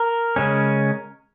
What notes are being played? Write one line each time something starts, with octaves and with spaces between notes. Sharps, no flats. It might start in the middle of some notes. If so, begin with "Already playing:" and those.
Already playing: A#4
C#3 G#3 C#4